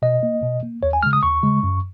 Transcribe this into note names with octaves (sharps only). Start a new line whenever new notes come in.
B2 D#5
A#3
B2
A#3
D#2 C#5
G#5
C#3 G#3 F6
D#6
D#2 C#6
C#3 G#3
F#2